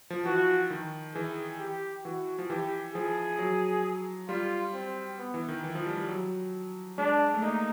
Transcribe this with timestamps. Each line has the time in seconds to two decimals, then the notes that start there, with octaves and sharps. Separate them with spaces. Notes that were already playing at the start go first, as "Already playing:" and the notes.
0.10 F3
0.25 E3 F#4
0.70 D#3
1.15 E3 G#4
1.60 G4
2.04 E3 F#4
2.39 F3
2.49 E3 G4
2.95 F3 G#4
3.39 F#3
4.29 G3 F4
4.74 C4
5.18 B3
5.34 E3
5.48 D#3
5.64 E3
5.75 F3
5.86 G3
5.97 G3
6.08 F#3
6.98 G#3 D4
7.34 A3
7.42 A#3 D#4